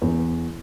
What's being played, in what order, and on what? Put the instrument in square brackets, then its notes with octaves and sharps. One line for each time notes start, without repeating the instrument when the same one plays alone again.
[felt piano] E2